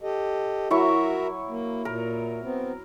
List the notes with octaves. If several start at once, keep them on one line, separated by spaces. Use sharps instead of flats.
G4 A4 D#5
F#3 E4 F#4 A#4 E5 C#6
A#3
A#2 A#4
B3 C4